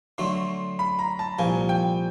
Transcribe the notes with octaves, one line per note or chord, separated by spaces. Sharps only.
D3 F#3 A3 C6
B5
A#5
A5
C2 A#2 F3 G#5
G5